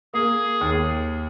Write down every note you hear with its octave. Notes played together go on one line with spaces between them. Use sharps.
A#3 G#4
D#2